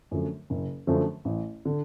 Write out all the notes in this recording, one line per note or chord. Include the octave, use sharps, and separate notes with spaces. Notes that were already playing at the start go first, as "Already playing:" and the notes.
F#2 D3 F3 A3
F#1
F#2 D3 F3 A3
A1
D3